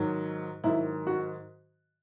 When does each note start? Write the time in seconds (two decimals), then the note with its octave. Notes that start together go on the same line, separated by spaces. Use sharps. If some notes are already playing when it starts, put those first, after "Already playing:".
Already playing: G#2 D#3 F#3
0.64 G#2 D#3 F#3 E4
1.07 F#4